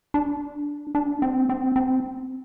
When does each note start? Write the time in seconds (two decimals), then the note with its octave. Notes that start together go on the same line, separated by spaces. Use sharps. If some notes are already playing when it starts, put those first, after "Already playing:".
0.14 D4
0.95 D4
1.22 C4
1.49 C4
1.76 C4